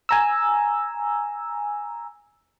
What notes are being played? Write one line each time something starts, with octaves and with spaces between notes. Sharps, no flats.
G#5 A#5 E6